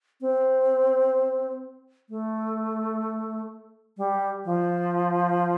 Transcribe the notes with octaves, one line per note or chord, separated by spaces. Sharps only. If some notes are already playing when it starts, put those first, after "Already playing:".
C4
A3
G3
F3